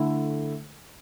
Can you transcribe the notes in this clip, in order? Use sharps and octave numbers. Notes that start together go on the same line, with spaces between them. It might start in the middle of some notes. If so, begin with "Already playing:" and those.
Already playing: D3 A3 E4